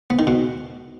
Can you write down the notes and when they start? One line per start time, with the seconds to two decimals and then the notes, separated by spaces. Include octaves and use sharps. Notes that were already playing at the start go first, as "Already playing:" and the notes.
0.10 B3
0.19 D#3
0.27 B2